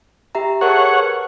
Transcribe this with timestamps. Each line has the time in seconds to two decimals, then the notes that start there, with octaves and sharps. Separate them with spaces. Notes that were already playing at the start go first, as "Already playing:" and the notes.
0.35 G4 E5 A#5
0.61 G#4 A#4 C#5 F#5 A5
0.93 B4